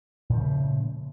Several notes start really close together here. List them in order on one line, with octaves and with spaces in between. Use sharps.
A#2 F3 C#3 A3